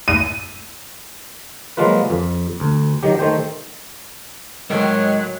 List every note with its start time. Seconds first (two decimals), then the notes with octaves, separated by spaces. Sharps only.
0.08 D#7
1.77 F3 F#3 G#3 A#3 F4 B4
2.10 F2
2.60 D2
3.03 D#3 F#3 G4
3.19 D#3 A3 C5 G5
4.70 A2 D#3 F#3 G#3 G5